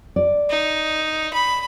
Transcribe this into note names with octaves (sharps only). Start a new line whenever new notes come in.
D5
D#4
B5